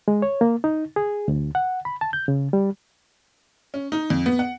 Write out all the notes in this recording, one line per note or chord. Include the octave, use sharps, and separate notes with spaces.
G#3
C#5
A#3
D#4
G#4
D2
F#5
B5
A5
G6
C#3
G3
C#4
D#4
F2
B3
F#5